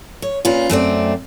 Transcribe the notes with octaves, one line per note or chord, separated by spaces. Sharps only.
C#5
A#2 C#4 F4 B4
F#2 A3 C4 D5